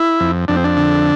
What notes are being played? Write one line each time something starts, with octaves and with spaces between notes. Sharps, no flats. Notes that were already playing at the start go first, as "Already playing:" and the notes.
Already playing: E4
F2
F2 D4
C4
D4
D3